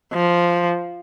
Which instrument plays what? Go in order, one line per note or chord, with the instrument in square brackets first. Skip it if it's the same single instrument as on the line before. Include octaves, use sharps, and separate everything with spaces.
[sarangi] F3